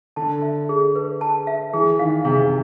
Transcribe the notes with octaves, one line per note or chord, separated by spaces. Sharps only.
D3 A5
E5
G#4
B4
A5
E5
E3 G#4
D#3 F5
C3 G#4
C3